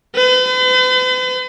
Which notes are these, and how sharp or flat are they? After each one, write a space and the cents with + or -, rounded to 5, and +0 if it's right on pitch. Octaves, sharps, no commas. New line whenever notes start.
B4 +45